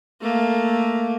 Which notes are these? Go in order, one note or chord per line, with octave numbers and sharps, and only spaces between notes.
A3 A#3